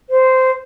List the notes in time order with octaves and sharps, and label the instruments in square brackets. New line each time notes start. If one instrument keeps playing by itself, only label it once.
[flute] C5